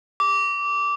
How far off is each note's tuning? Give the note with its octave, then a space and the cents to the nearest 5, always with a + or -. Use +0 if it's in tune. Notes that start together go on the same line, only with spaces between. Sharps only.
D6 -15